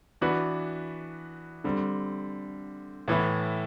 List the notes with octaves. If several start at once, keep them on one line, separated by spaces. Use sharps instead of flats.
E3 B3 D4 F#4 B4
D3 G3 C4
A2 E3 B3 E4